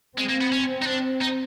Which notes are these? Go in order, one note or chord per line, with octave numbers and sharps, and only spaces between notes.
G#3 C4
A#3
B3
C#4
D#4
D4
D#4